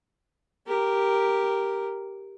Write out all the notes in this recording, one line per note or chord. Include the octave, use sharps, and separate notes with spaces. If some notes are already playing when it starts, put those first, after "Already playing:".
G4 A#4